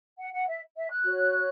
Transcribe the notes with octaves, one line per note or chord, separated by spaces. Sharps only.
F#5
F#5
E5
E5
F#6
F#4 C#5